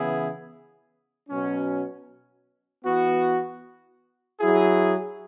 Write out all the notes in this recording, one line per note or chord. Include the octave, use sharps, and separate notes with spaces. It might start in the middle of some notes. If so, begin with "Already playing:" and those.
Already playing: C#3 E3 B3 E4 G#4
B2 F#3 C#4
E3 B3 F#4
F#3 E4 G#4